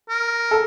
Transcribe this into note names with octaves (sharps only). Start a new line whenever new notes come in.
A#4
A4